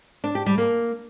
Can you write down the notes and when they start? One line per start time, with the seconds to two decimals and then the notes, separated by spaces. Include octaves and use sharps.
0.24 D4
0.35 G4
0.46 G3
0.58 A#3